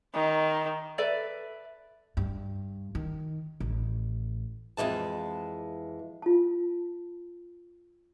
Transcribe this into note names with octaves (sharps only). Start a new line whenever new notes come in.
D#3
A4 B4 D5 E5
G2
D#3
A1
F2 G#2 E3 G#3 A5
F4 A5